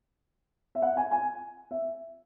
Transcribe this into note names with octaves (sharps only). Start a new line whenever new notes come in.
E5
F#5
G#5
G#5
E5